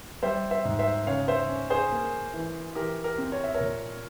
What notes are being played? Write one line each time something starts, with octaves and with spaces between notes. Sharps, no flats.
G3 C5 E5
C5 E5
G#2
C5 E5
C#3 C#5 F5
C5 E5
C#4
G#4 C5
A#3
E3
E3 G4 A#4
G4 A#4
C4
C#5
E5
A#4 C#5
A#2